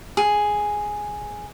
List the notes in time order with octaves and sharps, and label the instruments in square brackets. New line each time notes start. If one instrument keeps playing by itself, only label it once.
[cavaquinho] G#4